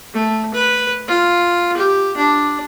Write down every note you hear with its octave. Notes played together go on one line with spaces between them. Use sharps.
A3
B4
F4
G4
D4